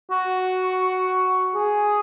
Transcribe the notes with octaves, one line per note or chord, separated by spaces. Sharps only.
F#4
G#4